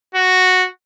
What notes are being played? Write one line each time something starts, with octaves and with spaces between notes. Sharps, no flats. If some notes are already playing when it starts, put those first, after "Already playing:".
F#4